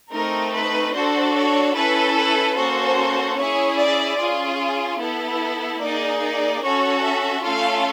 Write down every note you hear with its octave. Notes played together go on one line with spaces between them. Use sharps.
A3 C4 D#4 A#4
B4
D4 F#4 A4 C5
C#5
C#4 E4 A4 B4
B4
A#3 C#4 F#4 A4 C5
C#4 E4 G#4 C#5
D5
C#4 F4 G#4
B3 E4 A4
A#3 D#4 G#4 D5
D5
C#4 F#4 A4 C#5
E5
A3 C#4 F4 A4 F5